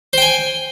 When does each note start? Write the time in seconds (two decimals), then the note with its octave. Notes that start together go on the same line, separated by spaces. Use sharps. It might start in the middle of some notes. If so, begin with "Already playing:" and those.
0.13 C5
0.18 G5
0.22 G#5